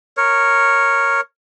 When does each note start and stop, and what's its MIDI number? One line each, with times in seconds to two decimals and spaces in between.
0.17 1.21 70
0.17 1.21 73